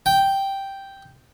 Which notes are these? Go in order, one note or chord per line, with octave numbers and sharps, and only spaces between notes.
G5